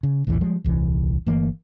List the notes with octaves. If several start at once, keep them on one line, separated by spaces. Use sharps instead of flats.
C#3
A#1 E2 A2 E3
F3 G3 G#3
D#1 C2 E3
G1 E3 A3 A#3